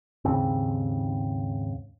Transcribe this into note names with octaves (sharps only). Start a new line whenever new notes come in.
D#2 G#2 C#3 C4